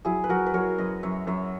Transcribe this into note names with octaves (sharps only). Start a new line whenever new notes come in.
F#3 E4 G#4
B4
F#3 F#4 A#4
B4
F#3 A#4 C#5
F#2 B4 D#5
F#2 C#5 E5
F#2 C#5 E5